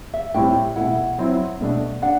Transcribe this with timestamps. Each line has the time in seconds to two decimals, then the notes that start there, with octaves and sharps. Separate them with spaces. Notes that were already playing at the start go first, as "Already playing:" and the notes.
0.14 E5
0.34 A2 G3 C4 E4 G5
0.76 B2 A3 E4 F#5
1.18 F#3 C4 E4
1.61 B2 A3 D4
2.02 D4 F#5